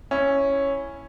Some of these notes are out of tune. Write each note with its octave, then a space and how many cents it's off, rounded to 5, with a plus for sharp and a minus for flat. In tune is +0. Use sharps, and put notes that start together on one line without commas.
C#4 +0 E4 +0